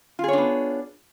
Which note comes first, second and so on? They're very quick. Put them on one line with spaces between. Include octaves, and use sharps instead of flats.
F4 G#4 C#5 D4 B3